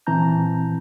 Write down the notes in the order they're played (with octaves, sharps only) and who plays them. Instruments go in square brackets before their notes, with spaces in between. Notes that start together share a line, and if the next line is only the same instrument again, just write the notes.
[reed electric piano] A#2 E3 C4 A5 A#5 G6